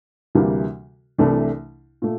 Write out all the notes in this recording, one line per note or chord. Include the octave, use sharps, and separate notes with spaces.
D2 C3 E3 G3 A#3
C2 C3 E3 A3 D4
A#2 A3